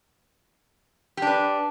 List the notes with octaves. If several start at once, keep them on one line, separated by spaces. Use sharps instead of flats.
D4 G4 B4